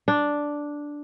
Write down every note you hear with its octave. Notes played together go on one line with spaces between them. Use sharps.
D4